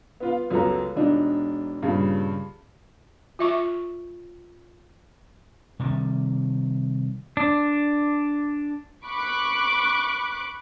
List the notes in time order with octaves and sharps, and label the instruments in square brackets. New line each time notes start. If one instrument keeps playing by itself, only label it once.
[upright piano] B3 F4 F5
C#2 F#2 F#3 B3 A4 A#5
E1 D4 D#4
G2 A#2 C#3
[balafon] F4 E5 C#6
[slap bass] C3 D#3 G3
[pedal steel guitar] D4
[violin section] B5 C#6 D6 F#6